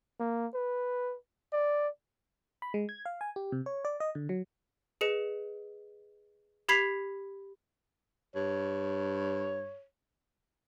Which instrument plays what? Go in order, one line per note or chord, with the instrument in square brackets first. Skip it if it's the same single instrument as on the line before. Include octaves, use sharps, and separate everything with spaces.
[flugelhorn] A#3
B4
D5
[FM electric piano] B5
G#3
G#6
F5
G#5
G4
C3
C#5
D5
D#5
D3
F#3
[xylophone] G#4 B4 D#5 C#7 E7
G4 B5 G#6 B6 C7 F7
[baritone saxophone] G2 [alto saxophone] C#5